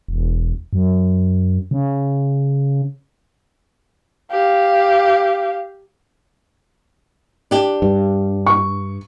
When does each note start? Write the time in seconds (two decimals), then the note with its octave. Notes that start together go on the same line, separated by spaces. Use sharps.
0.09 E1
0.73 F#2
1.71 C#3
4.31 G4 F5
7.51 D4 G4
7.82 G2
8.46 C#6